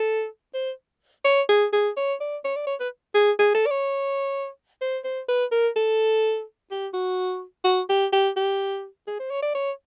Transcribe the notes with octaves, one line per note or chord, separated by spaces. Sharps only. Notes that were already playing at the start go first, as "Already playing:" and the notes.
Already playing: A4
C5
C#5
G#4
G#4
C#5
D5
C#5
D5
C#5
B4
G#4
G#4
A4
D5
C#5
C5
C5
B4
A#4
A4
G4
F#4
F#4
G4
G4
G4
G#4
C5
C#5
D5
C#5